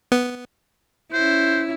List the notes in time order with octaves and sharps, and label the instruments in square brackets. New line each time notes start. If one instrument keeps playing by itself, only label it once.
[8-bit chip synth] B3
[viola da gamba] C#4 E4 [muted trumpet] C5